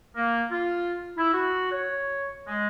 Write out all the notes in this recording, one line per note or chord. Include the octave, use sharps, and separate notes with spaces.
A#3
F4
E4
F#4
C#5
G#3